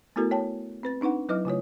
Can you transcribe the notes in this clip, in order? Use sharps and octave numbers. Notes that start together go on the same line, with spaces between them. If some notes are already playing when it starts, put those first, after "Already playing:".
A3 B3 E4 F#4 A4 A#4
C#5 G5 A5
C4 B4 A6
C4 D4 D#4 B4 F#5
F#3 E4 B4 D#5 D6 F6
C#3 A3 F4 C#5